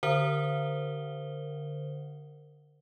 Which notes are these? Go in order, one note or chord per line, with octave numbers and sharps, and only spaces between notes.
D3 A#4 C5 F#5 G7